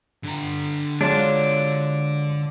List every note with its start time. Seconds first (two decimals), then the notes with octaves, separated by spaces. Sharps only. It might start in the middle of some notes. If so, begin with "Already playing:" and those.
0.24 D3 A#5
1.01 F#3 G#3 D4 F4